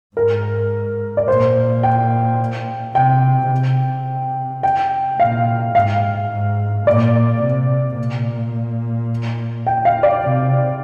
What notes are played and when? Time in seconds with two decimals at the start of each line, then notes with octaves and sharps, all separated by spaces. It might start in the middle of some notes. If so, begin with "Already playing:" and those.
0.16 G#2 A#4
1.17 D5
1.28 A#2 C5
1.83 G5
2.95 C3 G5
3.51 C3
4.63 G5
5.19 A#2 F5
5.75 G#2 F5
6.31 G#2
6.87 A#2 D5
7.42 C3
7.98 A#2
9.67 G5
9.85 F5
10.03 D5
10.22 C3